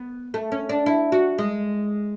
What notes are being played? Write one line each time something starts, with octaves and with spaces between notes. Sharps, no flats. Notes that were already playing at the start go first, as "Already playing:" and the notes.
Already playing: B3
A3
C#4
D4
E4
F#4
G#3